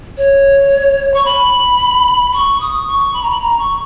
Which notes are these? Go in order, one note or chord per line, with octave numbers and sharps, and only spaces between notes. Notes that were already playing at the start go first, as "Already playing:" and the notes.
C#5
C#6
B5
C#6
D#6
C#6
B5
A#5
B5
A#5
C#6